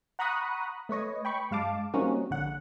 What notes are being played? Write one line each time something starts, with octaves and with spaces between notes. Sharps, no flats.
F#5 A#5 B5 C#6 D#6 F#6
A3 B4 C#5 D#5
G5 B5 C#6
G2 G#3 F5 A5 D6
G3 A#3 C4 C#4 D#4 F#4
A#1 D3 F#5